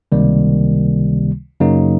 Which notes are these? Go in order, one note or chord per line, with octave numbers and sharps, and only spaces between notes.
C#2 C3 D#3 G3 A#3
F#2 C#3 F#3 A#3 D#4